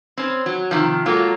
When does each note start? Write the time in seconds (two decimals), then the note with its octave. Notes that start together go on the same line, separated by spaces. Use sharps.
0.17 C4 C#4
0.46 F#3
0.71 C3 D#3 F3
1.06 F#3 G#3 A#3 F4 A4 C#5